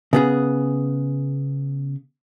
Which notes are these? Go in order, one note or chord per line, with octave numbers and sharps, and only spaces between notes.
C#3 B3 G#4